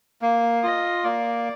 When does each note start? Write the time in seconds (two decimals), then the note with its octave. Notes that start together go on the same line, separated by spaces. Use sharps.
0.22 A#3
0.63 F4 D#5
1.04 A#3 D5